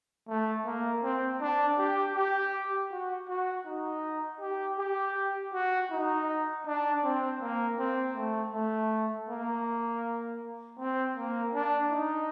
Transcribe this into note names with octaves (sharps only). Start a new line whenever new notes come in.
A3
A#3
C4
D4
G4
G4
F#4
F#4
D#4
G4
G4
F#4
D#4
D4
C4
A#3
C4
A3
A3
A#3
C4
A#3
D4
D#4